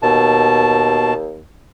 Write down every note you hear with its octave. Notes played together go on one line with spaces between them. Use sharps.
D#2 B2 A5